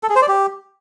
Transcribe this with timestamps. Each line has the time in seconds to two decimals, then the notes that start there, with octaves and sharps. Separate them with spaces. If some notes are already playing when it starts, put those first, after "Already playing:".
0.03 A4
0.09 G#4
0.16 C5
0.22 D5
0.28 G4